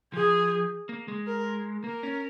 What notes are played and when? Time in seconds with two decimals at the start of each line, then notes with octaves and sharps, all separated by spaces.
0.13 F3 G#4
0.89 A#3
1.08 G#3
1.27 A#4
1.84 A#3 A#4
2.03 C#4